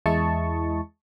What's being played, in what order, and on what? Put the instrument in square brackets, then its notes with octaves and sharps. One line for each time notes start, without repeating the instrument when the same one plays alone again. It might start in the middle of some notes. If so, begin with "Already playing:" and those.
[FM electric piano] E2 G#3 E4 D#5 A5 C#6